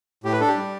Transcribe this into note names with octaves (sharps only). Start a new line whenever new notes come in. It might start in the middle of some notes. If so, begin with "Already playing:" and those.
A2 G4
B4
D4 A4
G4
G3